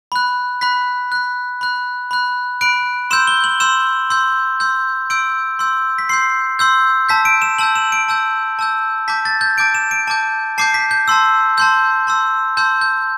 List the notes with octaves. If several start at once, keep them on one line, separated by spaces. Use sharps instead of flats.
B5 F#6
B5 F#6 B6
B5 F#6
B5 F#6
B5 F#6
B5 F#6 D7
C6 E6 G6 E7
G7
F#7
C6 E6 G6 E7
C6 E6 G6
C6 E6 G6
C6 E6 G6 D7
C6 E6 G6
B6
C6 E6 G6 C7
C6 E6 G6
A5 E6 G6 B6
D7
E7
A5 E6 G6 F#7
E7
D7
A5 E6 G6
A5 E6 G6
A5 D6 G6 B6
A6
G6
A5 D6 G6 D7
E7
D7
A5 D6 G6
A5 D6 G6 C7
B6
G6
A5 C6 E6
A5 C6 E6 G6
A5 C6 E6
A5 C6 E6 G6
G6